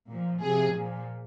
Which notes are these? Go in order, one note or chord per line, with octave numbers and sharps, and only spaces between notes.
A#2 F3
C3 F3 G#4
A#2 F3